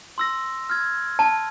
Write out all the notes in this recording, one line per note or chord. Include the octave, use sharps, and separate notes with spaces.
C6 E6 A#6
F6 G#6
A5